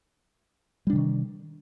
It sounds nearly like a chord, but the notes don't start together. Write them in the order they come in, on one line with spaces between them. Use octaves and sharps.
G3 D4 C3 D#3